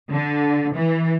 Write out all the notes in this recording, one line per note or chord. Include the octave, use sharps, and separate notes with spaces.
D3
E3